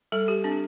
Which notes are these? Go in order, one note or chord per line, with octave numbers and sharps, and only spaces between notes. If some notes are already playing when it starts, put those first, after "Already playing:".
G3 A4
G4
C4 D4